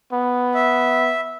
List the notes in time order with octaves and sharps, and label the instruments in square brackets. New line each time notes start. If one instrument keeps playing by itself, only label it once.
[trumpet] B3
[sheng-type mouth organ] E5